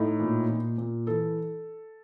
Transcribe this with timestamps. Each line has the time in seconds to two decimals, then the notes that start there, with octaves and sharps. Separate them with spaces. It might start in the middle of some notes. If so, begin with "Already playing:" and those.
Already playing: A2 D#4
0.20 A#2
0.49 A#2
0.78 A#2
1.07 E3 A4